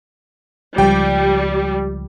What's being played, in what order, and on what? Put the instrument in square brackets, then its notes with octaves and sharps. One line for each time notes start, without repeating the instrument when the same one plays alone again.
[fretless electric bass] C#2 F3 [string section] G3 [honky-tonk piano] G5